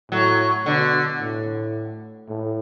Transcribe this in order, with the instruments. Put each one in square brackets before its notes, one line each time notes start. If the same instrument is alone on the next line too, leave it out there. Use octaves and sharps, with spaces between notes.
[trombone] A2 [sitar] F#3
[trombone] B2 [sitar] D3
[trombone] A2
A2